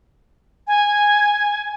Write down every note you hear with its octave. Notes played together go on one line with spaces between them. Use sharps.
G#5